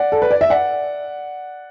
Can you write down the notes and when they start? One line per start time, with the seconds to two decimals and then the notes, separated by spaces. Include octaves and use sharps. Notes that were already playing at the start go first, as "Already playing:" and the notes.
Already playing: D5 F#5
0.12 A4
0.22 B4
0.31 D5
0.41 E5
0.50 D5 F#5